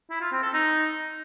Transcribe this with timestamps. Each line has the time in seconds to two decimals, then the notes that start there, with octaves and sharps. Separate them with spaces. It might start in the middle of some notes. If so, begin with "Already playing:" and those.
0.10 E4
0.21 F4
0.32 C4
0.43 A4
0.53 D#4